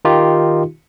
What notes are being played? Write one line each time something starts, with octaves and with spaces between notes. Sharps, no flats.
D#3 D#4 F4 G4